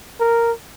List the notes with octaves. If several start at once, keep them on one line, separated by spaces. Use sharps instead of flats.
A#4